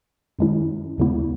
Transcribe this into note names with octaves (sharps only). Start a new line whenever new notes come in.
F#2 D#3 G#3 C#4 E4
D#2 C#3 G#3 B3 E4